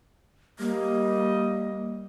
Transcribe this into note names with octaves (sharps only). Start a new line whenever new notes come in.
G3 A#3 D#5